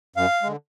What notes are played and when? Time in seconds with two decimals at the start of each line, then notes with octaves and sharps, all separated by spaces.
0.16 F#2 F5
0.43 D3 G#3